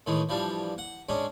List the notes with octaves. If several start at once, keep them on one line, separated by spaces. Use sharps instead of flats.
A2 D#3 E3 G#3
E3 F3 G3 D4
F#5
G#2 G#3 C#4 D4